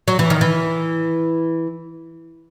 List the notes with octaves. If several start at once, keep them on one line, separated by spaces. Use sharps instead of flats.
F#3
E3
D#3
E3